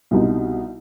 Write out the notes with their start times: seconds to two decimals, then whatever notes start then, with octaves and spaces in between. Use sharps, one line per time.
0.11 C2 B2 G3 B3 D#4